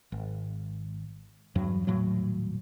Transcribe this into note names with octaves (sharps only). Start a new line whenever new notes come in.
G#1
E2 G2 F#3
D#1 A2 F#3